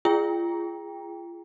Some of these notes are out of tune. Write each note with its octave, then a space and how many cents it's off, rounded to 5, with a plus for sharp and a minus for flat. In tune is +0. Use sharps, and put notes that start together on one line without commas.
F4 -35 G#4 -5 G5 +15